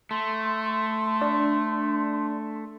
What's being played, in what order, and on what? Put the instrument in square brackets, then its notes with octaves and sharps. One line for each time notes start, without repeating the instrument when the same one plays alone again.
[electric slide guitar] A3 [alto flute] C6
[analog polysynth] D4